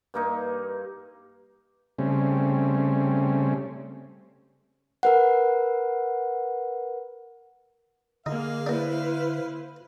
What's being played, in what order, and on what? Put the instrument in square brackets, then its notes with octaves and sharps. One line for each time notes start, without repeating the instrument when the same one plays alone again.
[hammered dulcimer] G2 A#3 D#4
[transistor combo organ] C#3 G3 A3 C4 C#4
[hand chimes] A#4 B4 F#5
[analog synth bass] D3 [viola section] A#3 G#4 [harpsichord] D#4 [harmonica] F5
[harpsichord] A#3 D4 [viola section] E4 B4 C5